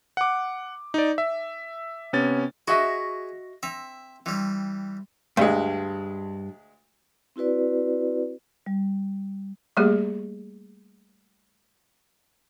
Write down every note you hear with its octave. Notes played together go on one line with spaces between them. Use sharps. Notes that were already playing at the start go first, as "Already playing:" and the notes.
F#5 D6
D#4 D5
E5
C3 B3 C#4 A6
F#4 G#4 D#5 E5
C4 E5
E3 G3 C4
D2 G2 G#3
C4 E4 F#4 B4 D5
G3
G3 A3 A#3 G4 G#4